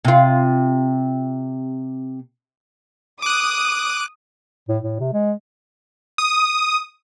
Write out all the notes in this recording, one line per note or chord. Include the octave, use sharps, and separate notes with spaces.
C3 F4
D6 D#6 F#6
A2
A2
C3
G#3
D#6